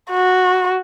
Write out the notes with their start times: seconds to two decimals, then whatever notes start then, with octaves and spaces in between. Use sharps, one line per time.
0.11 F#4